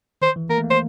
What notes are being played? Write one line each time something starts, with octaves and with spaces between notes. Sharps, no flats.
D#3 C5
E3
A#3 A#4
A3
A#3
C5